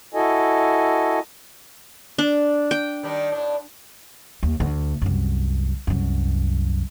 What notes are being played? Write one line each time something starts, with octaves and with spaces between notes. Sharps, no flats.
E4 F#4 A4 D#5 G#5
D4 D5
G5
D#3 G3 D4
A2 D4
D#2
D2
C2 F#2
C2 F#2